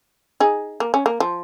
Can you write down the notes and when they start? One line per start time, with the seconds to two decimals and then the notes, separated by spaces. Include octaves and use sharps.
0.40 D#4 G#4
0.80 A#3
0.94 C#4
1.06 A#3
1.20 F3